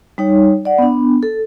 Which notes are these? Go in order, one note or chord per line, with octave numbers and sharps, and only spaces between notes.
G3 D#4 C#5
D5 F#5
B3 D4
A4